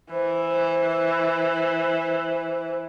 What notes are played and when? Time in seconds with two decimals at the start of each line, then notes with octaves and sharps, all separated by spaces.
0.11 E3 C5